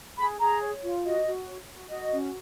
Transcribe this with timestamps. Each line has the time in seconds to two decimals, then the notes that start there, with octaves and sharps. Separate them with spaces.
0.18 G#4 B5
0.40 G#4 A#5
0.62 C#5
0.83 F4
1.04 F#4 D#5
1.26 F#4
1.48 C#5
1.68 F#4
1.90 F#4 D#5
2.12 C#4